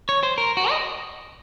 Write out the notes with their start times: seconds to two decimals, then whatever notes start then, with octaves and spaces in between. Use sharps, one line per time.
0.09 C#5
0.23 C5
0.38 A#4
0.57 F#4
0.70 D#5